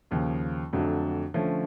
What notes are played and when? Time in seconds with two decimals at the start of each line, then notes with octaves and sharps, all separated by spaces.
0.11 D#2 C#3 F3
0.73 F2 D3 F#3 A3 D4
1.34 D3 F3 A3 C#4